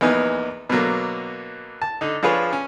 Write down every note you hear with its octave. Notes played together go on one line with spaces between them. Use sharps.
A#1 E2 B3 D#4 G#5
B2 D3 F#3 A#3
A5
D3 D#4
F3 D4 F4 G#4 B4 C#5
C#4